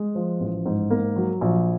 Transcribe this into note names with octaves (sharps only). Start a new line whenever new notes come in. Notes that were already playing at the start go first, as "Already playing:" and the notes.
Already playing: G#3
F3
A1
G#2
A#3
F#3
A#1